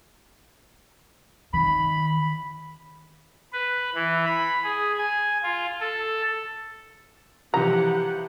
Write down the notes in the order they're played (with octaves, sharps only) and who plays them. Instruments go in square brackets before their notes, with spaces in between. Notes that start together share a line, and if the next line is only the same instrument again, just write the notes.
[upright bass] D#3 [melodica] B5
[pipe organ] B4
E3
B5
G#4
G#5
F4
A4
[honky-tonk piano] E3 F3 [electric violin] G4 F#5 [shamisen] A#5